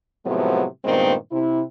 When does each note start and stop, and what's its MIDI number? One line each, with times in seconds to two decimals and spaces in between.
0.25 0.63 45
0.25 0.63 48
0.25 0.63 53
0.25 0.63 54
0.25 0.63 56
0.25 0.63 59
0.84 1.13 43
0.84 1.13 46
0.84 1.13 51
0.84 1.13 56
0.84 1.13 59
0.84 1.13 60
1.31 1.61 48
1.31 1.61 64